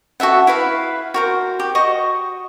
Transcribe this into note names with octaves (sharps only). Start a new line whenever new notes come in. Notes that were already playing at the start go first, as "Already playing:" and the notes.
F#4 A4 E5 F#5
E4 B4 F5
F#4 A#4 C5
G4
F#4 D#5 C#6